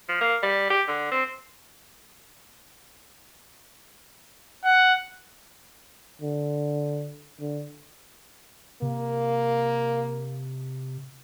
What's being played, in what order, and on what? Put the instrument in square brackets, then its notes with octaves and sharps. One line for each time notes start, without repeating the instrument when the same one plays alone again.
[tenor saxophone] F3
A#3
G3
G4
D3
C4
[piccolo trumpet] F#5
[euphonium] D3
D3
[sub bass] C3 [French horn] A#3